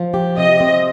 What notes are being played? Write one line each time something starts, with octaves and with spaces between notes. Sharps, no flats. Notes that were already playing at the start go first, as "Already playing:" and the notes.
Already playing: F3
G4
C3 D#5
C4